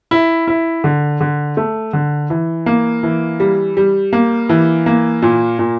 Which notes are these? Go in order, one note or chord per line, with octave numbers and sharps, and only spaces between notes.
E4
E4
D3
D3
A3
D3
E3
A#3
E3
G3
G3
A#3
E3
A#3
A#2
A#2